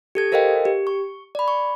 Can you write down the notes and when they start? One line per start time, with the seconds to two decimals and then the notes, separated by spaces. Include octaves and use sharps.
0.15 G4 A4 G#6
0.32 A4 A#4 C5 D#5 F5 G5
0.65 G4
0.87 C#6
1.35 D5 B5
1.48 C#6